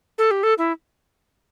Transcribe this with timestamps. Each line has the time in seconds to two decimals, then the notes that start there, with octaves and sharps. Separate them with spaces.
0.18 A4
0.31 G4
0.43 A4
0.58 E4